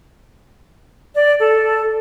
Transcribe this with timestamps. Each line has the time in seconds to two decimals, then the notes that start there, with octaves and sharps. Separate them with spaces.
1.15 D5
1.39 A4